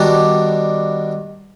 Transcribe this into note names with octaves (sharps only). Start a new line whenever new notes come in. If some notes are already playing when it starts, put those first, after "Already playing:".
Already playing: D#3 G3 B3 D4 F#4